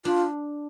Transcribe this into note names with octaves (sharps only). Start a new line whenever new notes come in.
D4 F4